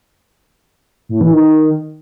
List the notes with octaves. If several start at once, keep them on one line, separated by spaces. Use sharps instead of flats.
A2
E3
D#3